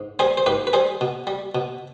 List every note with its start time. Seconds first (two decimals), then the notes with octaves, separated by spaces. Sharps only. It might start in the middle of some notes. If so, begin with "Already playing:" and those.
Already playing: G#2
0.19 G3 G#4 C5
0.37 C5
0.46 G#2 G4 B4
0.67 B4
0.73 G3 G#4 C5
1.01 B2
1.27 G3
1.55 B2